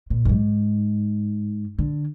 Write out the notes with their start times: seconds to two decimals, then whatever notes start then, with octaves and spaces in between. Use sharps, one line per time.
0.10 A#2
0.25 F#2
0.29 G#2
1.79 D3